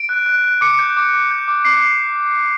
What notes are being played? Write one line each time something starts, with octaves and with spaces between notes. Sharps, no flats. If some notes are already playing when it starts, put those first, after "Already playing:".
Already playing: D7
F#6
F#6
F#6
D6 C#7
G6
D6
D6
G6
D6
D6 C7